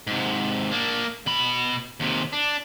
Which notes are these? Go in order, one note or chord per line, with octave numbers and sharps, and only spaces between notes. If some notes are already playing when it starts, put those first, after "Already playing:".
G#2 C3
A#3 D4
B2 B5
D#2 C3
D4